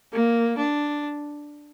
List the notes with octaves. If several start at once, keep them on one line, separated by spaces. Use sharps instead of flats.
A#3
D4